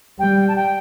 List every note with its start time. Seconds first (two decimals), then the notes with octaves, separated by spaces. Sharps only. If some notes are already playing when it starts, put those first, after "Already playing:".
0.19 G3 G5
0.48 A5
0.56 G5